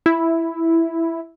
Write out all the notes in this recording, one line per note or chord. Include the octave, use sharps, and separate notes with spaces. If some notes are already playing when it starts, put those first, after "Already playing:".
E4